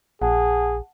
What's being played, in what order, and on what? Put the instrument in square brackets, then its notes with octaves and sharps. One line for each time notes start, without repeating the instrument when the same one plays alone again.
[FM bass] A#1 [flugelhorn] G#4 [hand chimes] F#5 A5